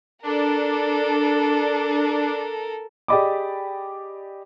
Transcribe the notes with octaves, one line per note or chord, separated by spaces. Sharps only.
D4 A4 A#4
G4 G#4 D5 D#5 B5 D6